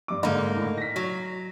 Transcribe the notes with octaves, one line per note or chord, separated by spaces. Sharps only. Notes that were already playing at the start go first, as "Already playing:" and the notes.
G2 D6
G#2 D3 A#3 D#4 D#5
A2
A#6 B6
F#3